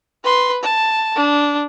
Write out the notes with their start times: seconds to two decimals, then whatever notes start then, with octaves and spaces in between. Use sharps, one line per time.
0.24 B4 C6
0.63 A5
1.15 D4